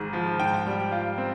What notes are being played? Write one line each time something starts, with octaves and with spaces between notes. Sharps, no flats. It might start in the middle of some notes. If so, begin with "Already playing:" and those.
Already playing: G#1 G#2 G#3
F3
G#2 G5
G3
F4
C4